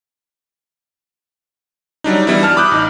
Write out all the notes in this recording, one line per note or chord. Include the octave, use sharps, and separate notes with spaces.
F#3 G3 D4 D#4
E3 G3 B3 E4
A5 F6
B5 D6 D#6 F#6 G6
A1 D#4